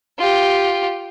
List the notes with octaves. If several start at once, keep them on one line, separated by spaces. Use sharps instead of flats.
F4 G4